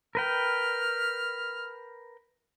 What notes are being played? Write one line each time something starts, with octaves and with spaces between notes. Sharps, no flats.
A#4 B4 G5 F6